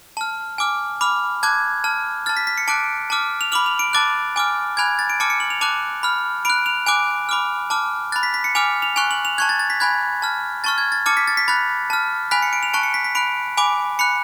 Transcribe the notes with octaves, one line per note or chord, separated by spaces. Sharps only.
A5 F6
G#5 D6 F6
B5 D6 F6
A5 D6 F#6 G#6
A5 F6
A5 F6 A6
B6
B6
C#7
A5 D6 F#6 D7
A5 D6 F6
F7
B5 D6 F6 F#7
F7
D7
A5 D6 F#6 A6
G#5 D6 F6
G#5 B5 F#6 G#6
A6
D7
A5 D6 F6 C#7
C#7
F#7
F7
A5 D6 F#6 F7
B5 F6
B5 F#6 D7
F7
G#5 D6 F#6 D7
B5 D6 F6
A5 D6 F6
B5 F#6 A6
B6
B6
C#7
G#5 D6 F6 F7
F7
G#5 C#6 F#6 F7
F#7
F7
A5 C#6 F#6 G#6
A6
A6
B6
G#5 B5 F#6 G#6
A5 F6
A5 C#6 F6 A6
G#6
A6
A5 D6 F6 C#7
B6
A6
B6
B5 F#6 A6
A5 F6
G#5 B5 F#6 B6
C#7
D7
F7
A5 C#6 F#6 D7
C#7
B6
B6
B5 F#6 D7
G#5 B5 D6
B5 F#6 C#7